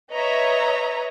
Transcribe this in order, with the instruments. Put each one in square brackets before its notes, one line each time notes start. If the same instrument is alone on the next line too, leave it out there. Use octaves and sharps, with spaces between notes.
[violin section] B4 C#5 D#5 E5 A#5